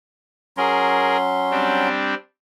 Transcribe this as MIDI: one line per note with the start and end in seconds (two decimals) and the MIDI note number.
0.57 1.89 54
0.57 1.89 61
0.57 1.17 68
0.57 1.17 70
0.57 1.89 84
1.51 2.14 55
1.51 2.14 60
1.51 2.14 62